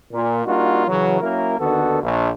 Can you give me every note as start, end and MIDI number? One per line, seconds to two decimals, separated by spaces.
0.13 0.42 46
0.46 0.83 55
0.46 0.83 58
0.46 0.83 62
0.46 0.83 63
0.46 0.83 65
0.46 0.83 66
0.88 1.19 49
0.88 1.19 52
0.88 1.19 54
1.21 1.59 54
1.21 1.59 58
1.21 1.59 61
1.21 1.59 64
1.21 1.59 70
1.59 1.99 39
1.59 1.99 50
1.59 1.99 51
1.59 1.99 59
1.59 1.99 66
1.59 1.99 69
2.03 2.30 34